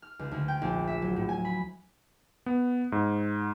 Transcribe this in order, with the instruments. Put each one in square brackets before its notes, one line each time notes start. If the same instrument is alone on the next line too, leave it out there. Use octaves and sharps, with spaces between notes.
[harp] F6
C#2
D2
G5
A#1
E5
F#3
A2
G#5
B5
[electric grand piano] B3
G#2